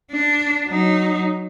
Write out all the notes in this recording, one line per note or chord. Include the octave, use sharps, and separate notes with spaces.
D4
F#3 D#4